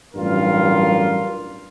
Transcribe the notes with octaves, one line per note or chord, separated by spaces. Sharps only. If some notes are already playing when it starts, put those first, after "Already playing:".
A1 G2 F#3 F4 A#4